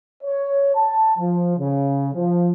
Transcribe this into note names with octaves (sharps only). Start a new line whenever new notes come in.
C#5
A5
F3
C#3
F3